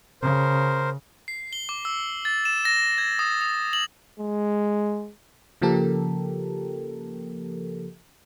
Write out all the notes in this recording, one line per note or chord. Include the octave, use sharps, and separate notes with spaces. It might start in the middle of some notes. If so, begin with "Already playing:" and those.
C#3 A#4 C5
C7
G7
D6
E6
A6
E7
A#6
G#6
D#6
D#6
F#7
G#3
C#3 F3 A#3 G4 A4 A#4